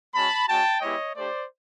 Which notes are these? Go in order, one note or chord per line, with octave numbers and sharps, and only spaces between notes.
G#3 C#4 F#4 A5 B5
G#3 C#4 F#4 G5 A5
G#3 B3 E4 G4 C#5 D#5
A3 D4 G4 C5 D5